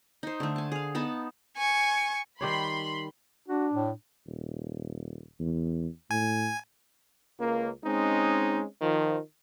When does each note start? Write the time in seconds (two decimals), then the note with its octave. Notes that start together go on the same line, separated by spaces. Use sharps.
0.23 D#4 C5
0.40 D3 A3
0.56 G#5 A5
0.72 G#4 F5
0.95 B3 D#4 A5 B5
1.57 G#5 C#6
2.41 D#3 G3 C#5 B5 C6
3.48 D4 F#4
3.73 A2
4.27 D#1
5.39 E2
6.11 A2 G#5
7.38 C#2 A#3
7.84 G#3 C4 C#4 D#4
8.80 D#3 F3